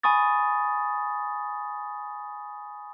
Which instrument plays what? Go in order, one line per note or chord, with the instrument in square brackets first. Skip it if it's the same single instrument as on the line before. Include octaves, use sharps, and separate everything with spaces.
[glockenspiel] G#5 B5 C#6 D#6 A6